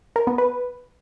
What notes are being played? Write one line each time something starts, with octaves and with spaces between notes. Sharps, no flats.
A#4
B3
B4